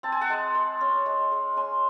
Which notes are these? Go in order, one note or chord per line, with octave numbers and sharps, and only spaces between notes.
C4 A5
G#5
F#5 A5
G#3
G#3
C#4
G#3
G#3
C#4 G#5 C6